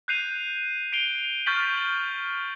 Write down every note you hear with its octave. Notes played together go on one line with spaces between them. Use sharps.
F#6 G6 C7 D#7 F7
C7 D7 F7 G7
C#6 F6 G6 A6 B6 F#7
A6 F#7